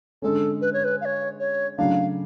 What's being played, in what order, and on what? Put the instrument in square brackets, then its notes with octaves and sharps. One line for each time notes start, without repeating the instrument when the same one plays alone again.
[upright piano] D3 G#3 C#4 [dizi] A4
[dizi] B4
C#5
B4
F5
C#5
C#5
[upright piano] C#3 F#3 A3 D4 [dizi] F5